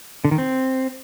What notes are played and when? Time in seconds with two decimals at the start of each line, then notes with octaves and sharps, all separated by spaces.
0.25 D3
0.31 D#3
0.38 C4